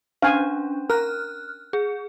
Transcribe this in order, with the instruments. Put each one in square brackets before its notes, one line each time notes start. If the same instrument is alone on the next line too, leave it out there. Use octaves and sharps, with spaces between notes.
[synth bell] C#4 D4 [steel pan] F5 G#5
[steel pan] A#4 [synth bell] F6 F#6
[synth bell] G#4